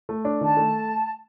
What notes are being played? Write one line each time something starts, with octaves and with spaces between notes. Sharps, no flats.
A3
D4
D#3 A5
A3